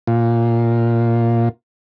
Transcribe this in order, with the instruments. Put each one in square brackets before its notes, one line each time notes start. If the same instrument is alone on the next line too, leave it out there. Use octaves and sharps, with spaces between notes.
[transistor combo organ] A#2 F4